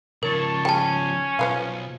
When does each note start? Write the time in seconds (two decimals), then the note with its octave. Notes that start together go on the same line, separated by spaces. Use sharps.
0.23 C#3 F3 A#4 C#5 A5
0.65 G3 C#4 G#4 G5 A5
1.39 B1 F3 B4 F5